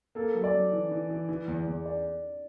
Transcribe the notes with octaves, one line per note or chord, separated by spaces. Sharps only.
A#3 A4
F#3
D5
F#3
E3
E3
E3
E3
E2
E2
D5